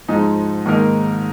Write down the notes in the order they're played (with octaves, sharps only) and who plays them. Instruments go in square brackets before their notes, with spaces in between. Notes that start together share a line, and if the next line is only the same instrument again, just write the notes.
[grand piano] G#2 F3 G#3 D#4
G#2 D#3 A#3 D#4 A#4